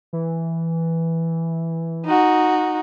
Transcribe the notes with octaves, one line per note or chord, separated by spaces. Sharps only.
E3
D#4 F#4